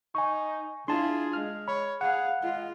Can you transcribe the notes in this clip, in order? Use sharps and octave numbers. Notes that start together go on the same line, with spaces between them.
D#4 G#5 C#6
D4 E4 F4 G#4 A5 C6
G#3 F6
C#5 B5
G#4 F5 F#5
G#3 F4